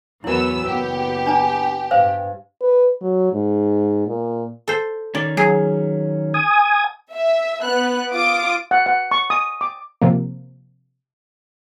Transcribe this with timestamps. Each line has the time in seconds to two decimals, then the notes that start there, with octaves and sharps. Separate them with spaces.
0.24 E2 E3 F#3 B3 E4 A#4 E6
0.66 F#1 B3 G4
1.26 D4 G#5 A#5
1.91 G2 B4 C5 F5
2.62 B4
3.01 F#3
3.33 G#2
4.07 A#2
4.68 A4 C5
5.15 D#3 C#4 D5
5.37 F#3 G#4
6.34 G#5 D#6
7.12 E5
7.62 B3 F#6
8.13 F4 D6 D#6 D7
8.71 F#5
8.86 F#5
9.11 C#6
9.30 D#6
9.61 D6
10.02 C3 F3 A#3